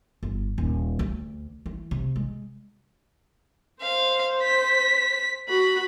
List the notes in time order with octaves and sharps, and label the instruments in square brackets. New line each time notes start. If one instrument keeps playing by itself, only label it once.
[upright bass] G1
D#1
D2
E3
C3
G#3
[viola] C5 [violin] F5
[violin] B6
[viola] F#4 [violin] B5